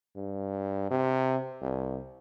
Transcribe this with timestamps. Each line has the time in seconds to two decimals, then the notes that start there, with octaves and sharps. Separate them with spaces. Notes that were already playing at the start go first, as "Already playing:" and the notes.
0.16 G2
0.91 C3
1.62 C2